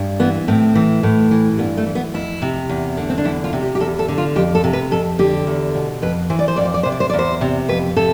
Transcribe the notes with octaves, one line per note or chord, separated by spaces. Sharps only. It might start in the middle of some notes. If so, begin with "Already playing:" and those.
Already playing: G2
E3 B3
A2 C4
E3
A2
E3
G2 B3
A3
E3
B3
F2 E4
C3
E2
D3
C4
D4
E2 E4
F4
C3
G4
G4
E2 A4
A4
D3
F4
F2 G4
A4
C3
B4
F2 A4
D3 G4
E2
B2
F2 B4
E3 C5
D5
C5
F2 D5
C5
D5
C3 C5
D5
C5
D5
E2
C5
C3
F2 B4
C3 A4